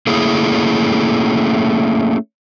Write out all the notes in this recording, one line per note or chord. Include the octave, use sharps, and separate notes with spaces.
A3 A#3 C#4 E4 G#4